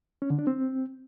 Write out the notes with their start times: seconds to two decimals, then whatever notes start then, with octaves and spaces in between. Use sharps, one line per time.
0.22 C#4
0.30 D3
0.39 D4
0.47 C4